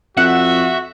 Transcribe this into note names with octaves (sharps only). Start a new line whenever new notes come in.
F2 F#4 E5 F#5